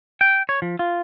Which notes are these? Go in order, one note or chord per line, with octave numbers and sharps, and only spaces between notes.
G5
C#5
F3
F4